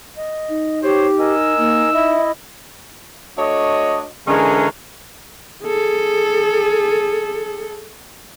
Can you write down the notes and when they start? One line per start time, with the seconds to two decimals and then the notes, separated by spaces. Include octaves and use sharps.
0.17 D#5
0.49 D#4
0.83 G4 C5 C#5
1.19 A#4 D#5 G#5 E6
1.58 A#3 D#4
1.93 E4 D#5 E5
3.38 A3 D4 F#4 C#5 D#5
4.27 D3 E3 G#3 C#4 G#4 A#4
5.64 G#4 A4